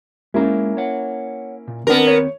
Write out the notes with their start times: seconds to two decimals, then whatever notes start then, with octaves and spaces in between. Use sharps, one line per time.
0.34 G#3 A#3 C#4 E4 A#5
0.77 C#5 F#5
1.68 A#2
1.87 D#2 B3 C4 D4 A#4
2.07 C#5